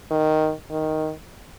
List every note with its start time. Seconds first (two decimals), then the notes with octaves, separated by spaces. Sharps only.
0.11 D#3
0.71 D#3